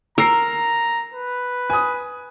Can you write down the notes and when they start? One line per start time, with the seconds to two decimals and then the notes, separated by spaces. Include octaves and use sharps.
0.18 A#4 A#5 E6 C7
1.13 B4
1.70 G#5 D#6